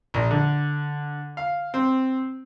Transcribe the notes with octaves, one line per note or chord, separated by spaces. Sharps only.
A#1
D3
F5
C4